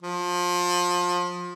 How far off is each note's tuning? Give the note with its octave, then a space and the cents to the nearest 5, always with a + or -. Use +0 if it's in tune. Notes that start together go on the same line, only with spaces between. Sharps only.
F3 +25